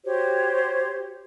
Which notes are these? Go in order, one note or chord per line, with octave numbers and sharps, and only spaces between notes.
F#4 G4 C5 C#5